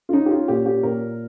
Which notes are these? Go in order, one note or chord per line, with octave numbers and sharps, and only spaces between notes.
F4
C#4 D#4
G4
F4
A#2 G4
G4
A#2 A#4